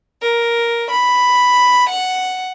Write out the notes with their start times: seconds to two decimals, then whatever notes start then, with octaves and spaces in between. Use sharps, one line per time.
0.21 A#4
0.90 B5
1.89 F#5